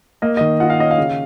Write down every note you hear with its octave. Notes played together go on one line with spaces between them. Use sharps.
A#3 D#5
D#3 D#5
F4 F#5
F5
C#4 D#5
F5
C#3